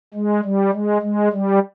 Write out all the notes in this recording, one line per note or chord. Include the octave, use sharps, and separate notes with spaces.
G#3
G3
G#3
G#3
G3